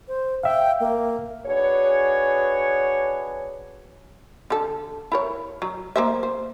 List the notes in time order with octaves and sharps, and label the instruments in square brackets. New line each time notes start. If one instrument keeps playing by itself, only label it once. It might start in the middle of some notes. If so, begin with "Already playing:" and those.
[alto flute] C5
[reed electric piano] E5 F5 [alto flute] G5
[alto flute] A#3
[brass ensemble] D4 F#4 G#4 B4 C#5
[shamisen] D3 A4
E4 A#4 C#5
F#3
A#3 C5 E5
C5